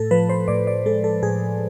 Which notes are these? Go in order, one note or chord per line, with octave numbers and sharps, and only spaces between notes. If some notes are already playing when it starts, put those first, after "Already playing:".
Already playing: A2 A4
F3 B4
C5
A2 D5
D5
G#3 A4
A4
A2 G#4